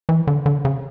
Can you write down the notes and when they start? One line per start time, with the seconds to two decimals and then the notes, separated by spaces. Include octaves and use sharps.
0.09 E3
0.27 D3
0.46 D3
0.65 C#3